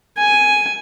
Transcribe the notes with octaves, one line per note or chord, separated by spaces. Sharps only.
G#5